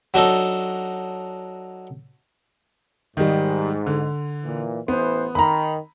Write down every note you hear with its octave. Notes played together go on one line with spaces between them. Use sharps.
F#3 D4 D#4 A4
G#2 D#3 G3
D3
A#2 E3
A1 E3 B3 C5
D#3 A#5 B5